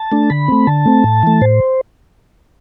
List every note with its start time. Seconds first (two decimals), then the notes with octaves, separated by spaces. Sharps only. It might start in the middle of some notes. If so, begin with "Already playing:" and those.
Already playing: A5
0.12 A3 D4
0.30 D3 B5
0.48 A3 C4
0.67 D3 A5
0.85 A3 C4
1.04 A2
1.23 E3 A3
1.41 A2 C5